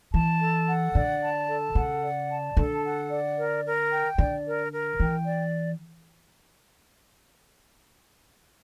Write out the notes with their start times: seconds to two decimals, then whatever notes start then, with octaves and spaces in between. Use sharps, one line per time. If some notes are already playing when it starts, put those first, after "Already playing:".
0.14 E3 A5
0.41 A4
0.68 F#5
0.95 D3 D5
1.22 A5
1.48 A4
1.75 C#3 F#5
2.03 D5
2.30 A5
2.56 D3 A4
2.84 F#5
3.11 D5
3.37 A#4
3.64 A#4
3.91 G5
4.18 D3 D5
4.45 A#4
4.72 A#4
5.00 E3 G5
5.27 D5